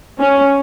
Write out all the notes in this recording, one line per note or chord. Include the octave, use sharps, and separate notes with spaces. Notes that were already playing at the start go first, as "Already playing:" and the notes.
C#4